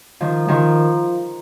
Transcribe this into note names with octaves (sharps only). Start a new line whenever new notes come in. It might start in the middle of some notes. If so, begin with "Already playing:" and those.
D#3 F3
D#3 F3